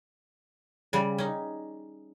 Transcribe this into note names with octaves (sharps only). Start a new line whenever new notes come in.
C#3 G3
C#4 D#4